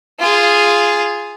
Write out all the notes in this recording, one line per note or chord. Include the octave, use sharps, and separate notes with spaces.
F4 G#4